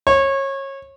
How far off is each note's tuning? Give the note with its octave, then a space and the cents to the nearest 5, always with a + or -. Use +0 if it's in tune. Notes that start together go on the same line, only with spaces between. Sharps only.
C#5 -25